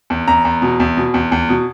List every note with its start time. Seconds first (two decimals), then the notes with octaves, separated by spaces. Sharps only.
0.10 E2
0.28 E2 A#5
0.45 E2
0.62 B2
0.80 E2
0.97 B2
1.14 E2
1.32 E2
1.49 B2